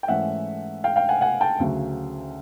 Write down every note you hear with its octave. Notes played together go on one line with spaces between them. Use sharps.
G5
G#2 E3 A3 C#4 E5 F#5
F5 G5
F5 G5
F#5 G#5
F#5 G#5
G5 A5
D2 C#3 F#3